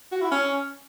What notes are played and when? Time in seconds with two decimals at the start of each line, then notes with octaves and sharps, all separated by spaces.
0.12 F#4
0.21 E4
0.31 C#4